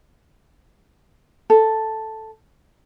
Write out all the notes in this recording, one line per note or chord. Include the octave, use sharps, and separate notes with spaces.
A4